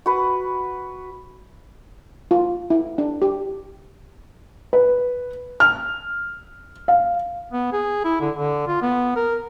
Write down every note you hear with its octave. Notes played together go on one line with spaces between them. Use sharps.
F#4 B4
F4
E4
D4
G4
B4
F6
F5
B3
G#4
E4
D3
D3
F4
B3
A#4